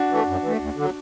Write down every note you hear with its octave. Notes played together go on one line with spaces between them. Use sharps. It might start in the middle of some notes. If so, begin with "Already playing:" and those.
Already playing: D4 F#4
E3 A3
F#2
E3 A3
D2
D3 F#3